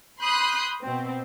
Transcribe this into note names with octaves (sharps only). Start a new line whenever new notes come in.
B5 C6 D#6 F#6 G6 C7
B2 C4